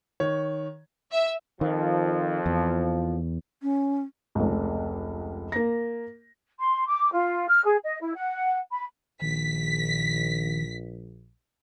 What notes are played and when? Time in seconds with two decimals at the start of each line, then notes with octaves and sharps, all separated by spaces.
0.20 D#3 C#5
1.12 E5
1.61 F2 D#3 F3
2.46 E2
3.63 C#4
4.35 F1 C#2
5.52 A#3 A#6
6.59 C6
6.87 D6
7.13 F4
7.48 F6
7.64 G#4
7.83 D#5
8.00 E4
8.14 F#5
8.70 B5
9.22 A#1 D#3 B6